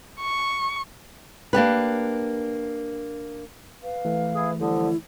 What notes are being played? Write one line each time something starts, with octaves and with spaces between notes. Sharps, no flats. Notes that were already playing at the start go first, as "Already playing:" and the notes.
C#6
A#3 D4 G4 B4
B4 F5
E3 A3
E4 G#4
D3 F3 G3 E4